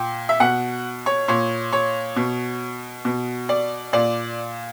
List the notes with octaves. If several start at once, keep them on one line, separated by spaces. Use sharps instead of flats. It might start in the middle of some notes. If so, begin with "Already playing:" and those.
Already playing: A#2 G5
E5
B2 F#5
C#5
A#2 C#5
C#5
B2
B2
D5
A#2 D5